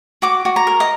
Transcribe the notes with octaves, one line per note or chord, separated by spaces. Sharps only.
F#4 D6
F#4
A#5
A#4
D#5